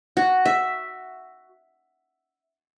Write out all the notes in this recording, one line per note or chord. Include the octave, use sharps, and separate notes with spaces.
F#4
E5